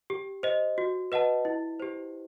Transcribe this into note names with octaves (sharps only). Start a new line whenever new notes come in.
G4
C5 D#5
F#4
B4 D#5 F#5 A5
E4
G4 C5